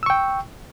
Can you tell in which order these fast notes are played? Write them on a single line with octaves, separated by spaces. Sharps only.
E6 C#6 G5